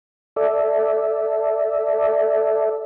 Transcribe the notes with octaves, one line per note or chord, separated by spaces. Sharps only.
A4 D5 E5